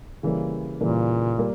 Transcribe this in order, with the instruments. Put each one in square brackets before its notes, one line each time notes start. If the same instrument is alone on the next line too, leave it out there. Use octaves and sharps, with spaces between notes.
[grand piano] C#3 E3 G3 A#3
[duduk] A#2 [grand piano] C#3 E3 G3 A#3
[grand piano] G3 A#3